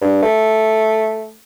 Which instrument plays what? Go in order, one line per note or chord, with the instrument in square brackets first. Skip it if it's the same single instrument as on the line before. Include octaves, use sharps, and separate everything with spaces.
[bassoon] G2
A3